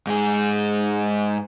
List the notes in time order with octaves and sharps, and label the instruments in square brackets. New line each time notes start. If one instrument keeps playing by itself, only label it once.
[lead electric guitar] G#2 G#4